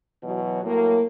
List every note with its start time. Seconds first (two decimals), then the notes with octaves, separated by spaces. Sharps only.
0.24 B2 E3 F#3
0.64 A2 F#3 A#3